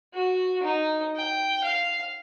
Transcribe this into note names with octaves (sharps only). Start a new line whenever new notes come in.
F#4
D#4
G5
F5